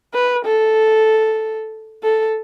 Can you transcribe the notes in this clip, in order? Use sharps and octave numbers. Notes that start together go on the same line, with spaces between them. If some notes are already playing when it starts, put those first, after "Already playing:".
B4
A4
A4